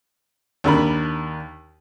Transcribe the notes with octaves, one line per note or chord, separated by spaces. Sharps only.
D#2 D4 A#4 B5